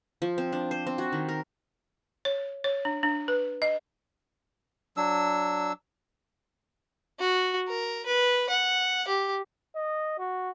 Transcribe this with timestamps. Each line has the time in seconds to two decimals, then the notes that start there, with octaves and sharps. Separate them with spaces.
0.22 F3
0.38 C4
0.52 D4
0.71 C5
0.87 C4
0.98 F#4
1.13 D#3
1.29 A#4
2.25 C#5
2.64 C#5
2.85 D4
3.03 D4
3.28 B4
3.62 D#5
4.97 F#3 D4 E6
7.20 F#4
7.68 A#4
8.06 B4
8.50 F#5
9.08 G4
9.75 D#5
10.19 F#4